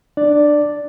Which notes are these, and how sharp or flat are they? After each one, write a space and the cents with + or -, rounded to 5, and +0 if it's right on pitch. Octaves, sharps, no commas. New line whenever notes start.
D4 +20 D5 +0